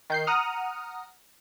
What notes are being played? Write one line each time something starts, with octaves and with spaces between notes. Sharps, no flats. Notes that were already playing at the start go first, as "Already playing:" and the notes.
D#3 G6 C7
F#5 A#5 D#6 F6